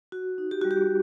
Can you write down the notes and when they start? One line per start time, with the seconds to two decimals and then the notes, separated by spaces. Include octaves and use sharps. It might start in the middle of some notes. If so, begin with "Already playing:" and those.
0.12 F#4
0.38 D#4
0.51 G4
0.61 G3 F#4
0.71 G4